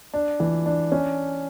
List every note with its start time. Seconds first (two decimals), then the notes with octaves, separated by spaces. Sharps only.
0.14 D4
0.40 E3
0.66 D4
0.92 C#4